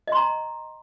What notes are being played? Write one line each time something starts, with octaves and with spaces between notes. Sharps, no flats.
D#5 A#5 C6